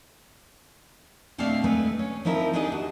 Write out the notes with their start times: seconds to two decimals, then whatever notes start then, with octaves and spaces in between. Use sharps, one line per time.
1.38 B2 A3 C4 D4 E5 F5
1.64 G#3 A3 B4
1.99 C#4
2.25 F3 C4 D#4 E4 A#4
2.53 D4 D#4 G4 G#4 D#5
2.72 F#4